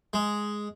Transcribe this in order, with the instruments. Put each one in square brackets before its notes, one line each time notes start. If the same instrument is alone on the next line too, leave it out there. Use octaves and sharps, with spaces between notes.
[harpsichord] G#3